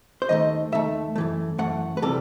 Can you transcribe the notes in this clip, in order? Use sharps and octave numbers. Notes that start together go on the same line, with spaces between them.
C5
D#2 D#3 A3 D#5
D#2 D#3 A3 E5
F#2 E3 A3
F#2 E3 A3 F#5
B4
C3 E3 G3 A4